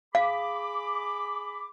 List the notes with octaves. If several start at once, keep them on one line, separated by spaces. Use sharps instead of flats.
G#4 F5 B5 D6